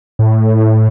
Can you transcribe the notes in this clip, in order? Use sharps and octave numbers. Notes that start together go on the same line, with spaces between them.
A2